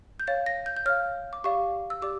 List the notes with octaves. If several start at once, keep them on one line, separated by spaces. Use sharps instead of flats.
G6
C#5 F5 A6
A#6
G6
G6
C#5 F5 F6
D6
G4 D5 F5 C#6
E6
G4 D5 D6